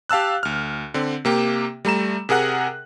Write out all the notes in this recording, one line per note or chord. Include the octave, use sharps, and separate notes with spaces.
G4 F5 A5 E6 F#6
D2 F6
D3 C4
C3 A#3 G4
G3 A3 A#5 E7
C3 G#4 A#4 F#5 F#6